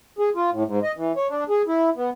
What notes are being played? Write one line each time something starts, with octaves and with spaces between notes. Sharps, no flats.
G#4
F4
A2
G#2
D#5
E3
C#5
D4
G#4
E4
B3